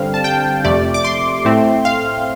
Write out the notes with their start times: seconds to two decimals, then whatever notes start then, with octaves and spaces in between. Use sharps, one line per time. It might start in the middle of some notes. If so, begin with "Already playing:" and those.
Already playing: G2 D3 G3 C4 F5
0.14 A5
0.24 G5
0.64 F2 C3 A3 D5
0.94 D6
1.04 C6
1.45 A2 A3 C4
1.85 F5